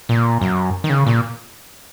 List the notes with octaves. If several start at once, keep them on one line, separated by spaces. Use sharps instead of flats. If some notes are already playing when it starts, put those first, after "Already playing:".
A#2
F#2
D#3
C#3
A#2